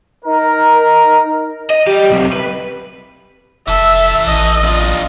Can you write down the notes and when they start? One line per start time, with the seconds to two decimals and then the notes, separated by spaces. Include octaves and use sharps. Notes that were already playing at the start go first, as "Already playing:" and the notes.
0.25 D#4 A#4
1.70 D#5
1.87 G3 G4
2.09 B1 C3
2.32 B4
3.68 F1 E3 A4 E5
4.27 A1 D#5
4.64 D4 F4